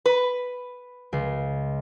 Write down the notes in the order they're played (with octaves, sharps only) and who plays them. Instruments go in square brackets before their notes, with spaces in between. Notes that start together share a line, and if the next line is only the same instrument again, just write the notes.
[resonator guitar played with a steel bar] B4
[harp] C#2